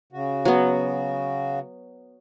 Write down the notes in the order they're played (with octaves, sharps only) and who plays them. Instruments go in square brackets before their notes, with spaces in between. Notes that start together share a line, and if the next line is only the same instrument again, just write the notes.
[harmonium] C#3 F#4
[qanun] F#3 B3